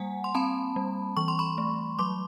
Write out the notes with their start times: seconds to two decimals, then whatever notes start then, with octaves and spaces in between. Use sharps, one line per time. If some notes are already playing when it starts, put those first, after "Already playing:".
Already playing: G3 A#3 F#5 G#5
0.24 C6
0.35 C4 A5 B5
0.76 G3
1.17 E3 C#6
1.28 C6
1.39 B5 C#6
1.58 A3
1.98 F#3 C6 D6